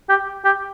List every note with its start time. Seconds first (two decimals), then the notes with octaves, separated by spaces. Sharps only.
0.09 G4
0.45 G4